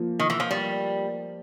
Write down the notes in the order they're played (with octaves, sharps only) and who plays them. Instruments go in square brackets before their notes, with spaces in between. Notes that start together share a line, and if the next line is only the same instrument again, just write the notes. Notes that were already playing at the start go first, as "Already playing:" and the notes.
Already playing: [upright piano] F3 A#3
[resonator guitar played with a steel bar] D#3
E3
F3
G3